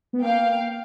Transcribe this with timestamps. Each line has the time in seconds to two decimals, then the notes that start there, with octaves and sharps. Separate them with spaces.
0.13 B3
0.22 A#3 F5 G5